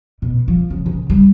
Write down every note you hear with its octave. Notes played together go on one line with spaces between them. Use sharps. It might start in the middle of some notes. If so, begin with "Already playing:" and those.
B2
F3
C#3
C#3
G3